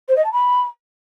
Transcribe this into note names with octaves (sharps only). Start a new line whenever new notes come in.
C5
D#5
A5
B5